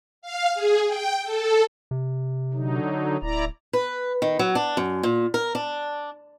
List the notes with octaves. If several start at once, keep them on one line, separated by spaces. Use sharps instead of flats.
F5
G#4
G5
A4
C3
D3 F#3 D#4
D1 E4 D5 A#5
B4
D#3
F#3
D4
F#2
A#2
A#4
D4